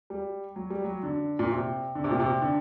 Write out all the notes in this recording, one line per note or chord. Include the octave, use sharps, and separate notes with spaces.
G3
F#3
G3
F#3
D3
A#2
C3
D3
C3
A#2
C3
D3